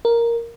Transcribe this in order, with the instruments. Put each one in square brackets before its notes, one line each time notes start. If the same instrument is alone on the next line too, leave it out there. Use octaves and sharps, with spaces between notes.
[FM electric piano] A#4